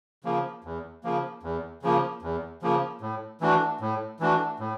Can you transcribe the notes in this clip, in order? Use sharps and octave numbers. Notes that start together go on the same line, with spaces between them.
C#3 F3 A#3
E2
C#3 F3 A#3
E2
C#3 F3 A#3
E2
C#3 F3 A#3
A2
E3 A3 D4 F#4
A2
E3 A3 D4 F#4
A2